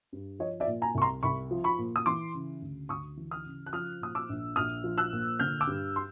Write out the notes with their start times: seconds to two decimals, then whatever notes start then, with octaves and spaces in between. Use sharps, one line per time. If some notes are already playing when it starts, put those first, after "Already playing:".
0.13 G2
0.39 F3 C#5 D#5
0.60 D5 E5
0.67 A#2
0.82 G#5 A#5
0.95 C2 C#6
1.02 A#5 C6
1.23 C2 B5 C#6
1.51 F3
1.64 B5 C#6
1.78 A#2
1.96 D#6
2.06 E3 C6 D6
2.34 C#3
2.62 D2
2.89 D2 C#6 D#6
3.17 E3
3.31 D#6 F6
3.46 C#3
3.66 F#6
3.73 F3 D#6 F6
4.01 A#2 D#6
4.15 D6 E6
4.29 A#1
4.56 A#1 D#6 F6
4.84 F3
4.98 E6 F#6
5.12 A#2
5.39 D3 F6 G6
5.61 D6 E6
5.67 G2
5.96 C6